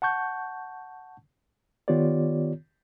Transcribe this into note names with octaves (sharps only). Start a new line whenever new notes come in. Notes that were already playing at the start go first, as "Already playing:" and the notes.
F#5 A5 C#6 G6
D#3 B3 F4 G4 C#5 D5